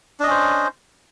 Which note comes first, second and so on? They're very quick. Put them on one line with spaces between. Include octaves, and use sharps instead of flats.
D4 D#5 C#4 C5